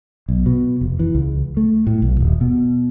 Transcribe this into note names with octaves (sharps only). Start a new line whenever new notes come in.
B1
B2
F1
E3
C#2
A3
A2
B1
D#1
B2